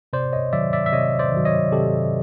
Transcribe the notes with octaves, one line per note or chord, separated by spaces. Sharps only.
C3 C5 D5
C#5 D#5
D#3 F#3 D5 E5
D5 E5
E5
C3 C#5 D#5
C5 D5
D#3 F#3
C#5 D#5
C3 G4 A4